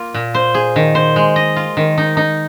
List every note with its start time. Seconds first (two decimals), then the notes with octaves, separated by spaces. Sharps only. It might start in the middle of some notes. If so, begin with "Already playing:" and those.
Already playing: A#3 F4
0.14 A#2
0.35 C5
0.55 G#4
0.76 D#3
0.95 C5
1.16 G#3
1.36 D#5
1.56 F4
1.77 D#3
1.98 D#4
2.17 D#4